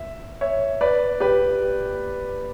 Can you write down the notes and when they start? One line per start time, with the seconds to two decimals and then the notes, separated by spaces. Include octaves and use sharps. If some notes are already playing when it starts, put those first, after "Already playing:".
Already playing: E5
0.41 C#5 E5
0.81 B4 D5
1.20 G4 B4